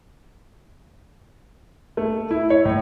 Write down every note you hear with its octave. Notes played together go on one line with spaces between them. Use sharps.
A3
E4
C#5
A2